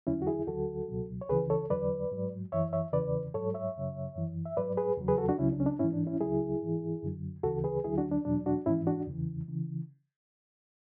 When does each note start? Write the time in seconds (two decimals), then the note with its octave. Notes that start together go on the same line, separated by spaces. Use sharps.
0.07 E2 D3 F#3 C#4 E4
0.22 F#4
0.27 E4 G#4
0.47 D2 D3 F#3 F#4 A4
0.88 C#2 B2 F#3
1.21 C#5
1.29 C#2 C#3 E3 G#4 B4
1.50 A4 C#5
1.70 E2 D3 F#3 B4 D5
2.11 G#2 F#3
2.52 F#2 E3 C#5 E5
2.73 C#5 E5
2.93 E2 C#3 E3 B4 D5
3.34 G#2 F#3 A4 C#5
3.54 C#5 E5
3.75 F#2 C#3 F#3
4.16 F#2 E3
4.45 E5
4.57 G#2 F#3 B4 D5
4.77 G#4 B4
4.98 E2 C#3 F#3
5.08 G#4 B4
5.18 F#4 A4
5.29 D4 F#4
5.38 C#2 C#3 F#3 C#4 E4
5.53 D4
5.60 C#4
5.66 D4
5.79 G#2 E3 C#4 E4
5.93 D4
6.07 C#4 E4
6.21 C#2 C#3 F#3 E4 G#4
6.62 G#2 E3
7.03 F#2 D3 F#3
7.43 D2 C#3 E3 F#4 A4
7.64 G#4 B4
7.84 D2 D3 F#3 E4 G#4
7.98 D4 F#4
8.12 D4
8.25 E2 B2 F#3 D4
8.46 D4 F#4
8.66 G#2 E3 C#4 E4
8.87 D4 F#4
9.07 E2 C#3 E3
9.48 C#3 E3